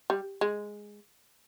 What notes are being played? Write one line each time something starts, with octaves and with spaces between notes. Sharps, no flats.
G3
G#3